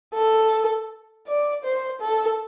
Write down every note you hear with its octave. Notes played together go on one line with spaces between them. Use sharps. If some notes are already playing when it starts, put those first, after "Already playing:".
A4
D5
C5
A4